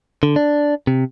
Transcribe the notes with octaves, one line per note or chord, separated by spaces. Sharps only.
D3
D4
C3